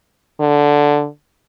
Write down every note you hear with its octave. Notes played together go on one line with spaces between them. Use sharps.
D3